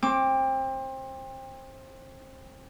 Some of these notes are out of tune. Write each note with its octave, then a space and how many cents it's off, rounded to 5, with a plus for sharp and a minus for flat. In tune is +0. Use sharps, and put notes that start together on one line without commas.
C4 +25 D6 +0